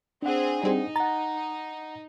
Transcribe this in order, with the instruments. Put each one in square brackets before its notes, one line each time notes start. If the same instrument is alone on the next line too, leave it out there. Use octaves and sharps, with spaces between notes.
[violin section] C4 G#4 [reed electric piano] D4 F#5
[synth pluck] G3 C4 G#4 [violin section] D#4
[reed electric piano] F#5 A#5 [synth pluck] A6